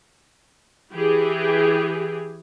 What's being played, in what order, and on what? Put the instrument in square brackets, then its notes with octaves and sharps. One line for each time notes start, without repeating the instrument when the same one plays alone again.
[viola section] E3 G4 G#4